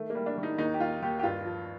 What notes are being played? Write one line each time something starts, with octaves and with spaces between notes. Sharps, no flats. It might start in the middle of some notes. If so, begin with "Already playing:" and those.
Already playing: D#3 A3
A#3
G3
D4
D#3
D#4
D#2 D#4
G4
D#2 F4
D#2 G4
G4
G2 F4
F3